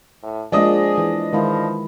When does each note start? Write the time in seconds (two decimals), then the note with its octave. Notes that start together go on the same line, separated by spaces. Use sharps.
0.23 A2
0.52 F3 G#3 A#3 D4 G#4 D#5 D#6
0.98 E3
1.33 D#3 F3 G#3 E4